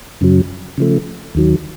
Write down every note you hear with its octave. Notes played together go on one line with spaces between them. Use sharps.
F#2 C#3 F#3
C#3 F3 A3
D#2 D#3 F#3